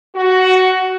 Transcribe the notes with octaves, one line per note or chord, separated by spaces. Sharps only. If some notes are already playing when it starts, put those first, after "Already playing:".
F#4